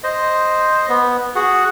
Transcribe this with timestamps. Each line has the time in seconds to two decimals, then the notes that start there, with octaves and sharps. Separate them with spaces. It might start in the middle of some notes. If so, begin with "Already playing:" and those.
0.04 C5 D#5
0.89 B3
1.35 F#4 G#4 F#5